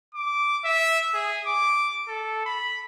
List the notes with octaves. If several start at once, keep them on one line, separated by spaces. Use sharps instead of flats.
D6
E5
G#4
D6
A4
B5